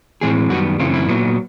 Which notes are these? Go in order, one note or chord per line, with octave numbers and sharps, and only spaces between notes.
A2 E3 G#3 C4 G#4
F#2 D#3 G3 B3 F#4
F#2 C#3 E3 A3 C4 F4
E4
A#2 F#3 B3